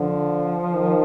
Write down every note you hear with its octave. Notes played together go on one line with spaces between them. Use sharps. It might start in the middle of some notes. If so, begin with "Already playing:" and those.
Already playing: D3 F3
D#3